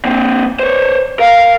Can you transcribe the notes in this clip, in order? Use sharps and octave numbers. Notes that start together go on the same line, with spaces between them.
A#3 C4
C5 C#5
A#4 F5